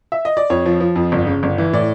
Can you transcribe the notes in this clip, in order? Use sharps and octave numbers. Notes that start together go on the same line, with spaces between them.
E5
D#5
D5
F2 C#5
F3
F3
F2
G1
C#3
G1
E3
A2 D5